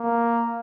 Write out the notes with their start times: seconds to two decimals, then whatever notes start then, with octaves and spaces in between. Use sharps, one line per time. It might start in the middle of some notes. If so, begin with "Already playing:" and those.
Already playing: A#3